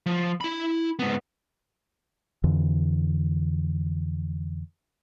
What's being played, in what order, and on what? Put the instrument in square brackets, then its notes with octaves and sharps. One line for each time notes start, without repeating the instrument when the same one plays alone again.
[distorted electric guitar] F3
E4 B5
G#2 B3
[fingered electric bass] F2 D3 E3